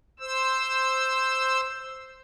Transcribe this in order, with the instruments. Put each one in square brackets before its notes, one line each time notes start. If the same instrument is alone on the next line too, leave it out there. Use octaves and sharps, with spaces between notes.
[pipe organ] C5 E6